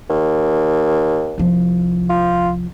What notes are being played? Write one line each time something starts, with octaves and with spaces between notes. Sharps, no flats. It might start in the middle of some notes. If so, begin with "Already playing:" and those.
D#2
C2 F3
F4